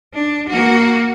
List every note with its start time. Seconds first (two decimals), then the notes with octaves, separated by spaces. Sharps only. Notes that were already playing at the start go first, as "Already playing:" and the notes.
0.13 D4
0.49 A#3 F#4